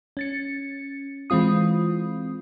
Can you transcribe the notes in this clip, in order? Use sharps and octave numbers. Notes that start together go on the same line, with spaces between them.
C#4 A6 C#7
E3 G#3 C4 F4 D#6